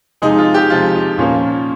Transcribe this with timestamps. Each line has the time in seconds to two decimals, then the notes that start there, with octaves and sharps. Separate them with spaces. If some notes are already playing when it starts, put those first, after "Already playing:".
0.22 C3 F3 G#3 D#4
0.38 F4
0.54 G4
0.70 C3 F3 G#3 F4
0.94 F4
1.18 A#2 F3 A#3 C#4